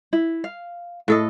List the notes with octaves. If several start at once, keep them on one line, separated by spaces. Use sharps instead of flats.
E4
F5
A2 A4 D#5